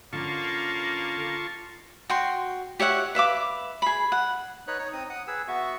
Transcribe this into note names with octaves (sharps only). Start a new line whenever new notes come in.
D3 A#3 C#4 F4 A5 C#6
F#4 G5 C6
G4 C#5 E5 F#5
B4 E5 F5 D6
G#4 B5
F#5
D#4 B4 C#5 F#6
D#4 C#5
C4 D#4 D#6
F#5 D#6
G#4 B4 E6
B3 F#4 E5 C#6